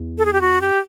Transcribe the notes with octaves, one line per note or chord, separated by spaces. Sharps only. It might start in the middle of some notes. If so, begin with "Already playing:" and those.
Already playing: E2
A4
G#4
F2 G4
E2 F#4
F2
F#2 G4